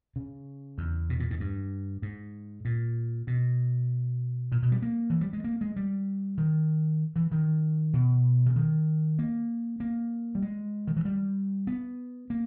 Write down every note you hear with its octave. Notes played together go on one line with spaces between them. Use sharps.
C#3
E2
B2
A#2
G#2
G2
G#2
A#2
B2
A#2
B2
G3
A#3
E3
G3
G#3
A#3
G#3
G3
D#3
E3
D#3
B2
C#3
D#3
A#3
A#3
G3
G#3
D#3
E3
G3
B3
A#3